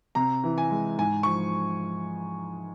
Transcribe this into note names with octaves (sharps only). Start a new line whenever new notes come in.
C3 A#5
E3
G#5
G#3
G#2 G#5
F3 C#6